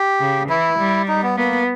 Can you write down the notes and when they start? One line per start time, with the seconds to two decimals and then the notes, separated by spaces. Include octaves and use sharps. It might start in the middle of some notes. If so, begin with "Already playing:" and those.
Already playing: G4
0.20 C#3
0.49 E3 E4
0.78 G3
1.08 D#4
1.23 B3
1.37 A#3 B3